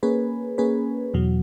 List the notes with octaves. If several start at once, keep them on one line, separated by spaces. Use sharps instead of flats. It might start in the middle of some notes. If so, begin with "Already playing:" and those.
A#3 C#4 G#4 B4
A#3 C#4 G#4 B4
E2 B2 F#3